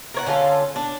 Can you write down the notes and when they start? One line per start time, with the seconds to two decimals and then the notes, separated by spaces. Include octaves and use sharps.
0.14 A#4 C#5 F#5
0.26 D3 C#4 F4 A4
0.76 D4